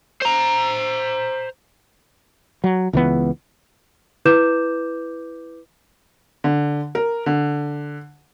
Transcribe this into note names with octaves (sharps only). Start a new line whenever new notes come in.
C5 A#5
F#3
C#2 E3 B3
E4 B4 D6 G6 E7
D3
A#4
D3